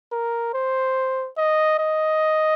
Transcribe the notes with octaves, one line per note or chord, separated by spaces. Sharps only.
A#4
C5
D#5
D#5